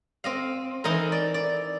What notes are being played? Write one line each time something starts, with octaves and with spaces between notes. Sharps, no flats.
C4 D#5 F5
E3 D#4 E4 A#4
D5
D5